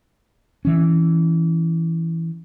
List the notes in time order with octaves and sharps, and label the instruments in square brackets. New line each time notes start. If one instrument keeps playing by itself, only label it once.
[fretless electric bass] E3 C#4